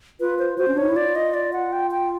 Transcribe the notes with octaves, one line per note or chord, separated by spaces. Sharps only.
F4 B4
C5
F#4 C5
C#4
D4
D#4 C#5
E4
F4 D5
D#5
D5
F#5
G5
G5